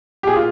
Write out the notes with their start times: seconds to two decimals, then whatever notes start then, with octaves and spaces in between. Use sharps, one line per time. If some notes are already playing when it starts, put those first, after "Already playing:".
0.23 G4
0.27 A#2 G#4
0.36 F4